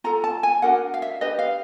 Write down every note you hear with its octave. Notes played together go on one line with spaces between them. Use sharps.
F4 A4 A#5
A5
G#5
D4 F#4 A#4 F#5
F5
E5
D4 G4 B4 D#5
F5